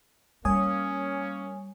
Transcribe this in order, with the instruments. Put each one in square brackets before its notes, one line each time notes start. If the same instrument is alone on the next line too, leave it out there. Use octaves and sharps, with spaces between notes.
[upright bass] G3 [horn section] A#3 C#4 [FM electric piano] C#5 G#5 [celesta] D#6